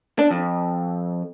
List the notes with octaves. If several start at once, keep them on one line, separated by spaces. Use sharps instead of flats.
D4
F2